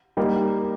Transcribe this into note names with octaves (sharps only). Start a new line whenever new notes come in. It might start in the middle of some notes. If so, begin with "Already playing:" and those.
G3 A#3 D#4